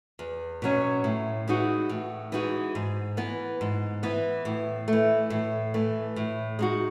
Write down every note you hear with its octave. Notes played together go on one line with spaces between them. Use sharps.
E2
B2 F#3 C#4
A2
E3 G#3 D#4 F#4
A2
E3 G#3 D#4 F#4
G#2
E3 B3
G#2
E3 B3
A2
E3 A3
A2
E3 A3
A2
G#3 D#4 F#4